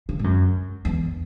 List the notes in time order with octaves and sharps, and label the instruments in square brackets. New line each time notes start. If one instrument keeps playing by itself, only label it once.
[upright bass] C#3
G#2
F#2
E2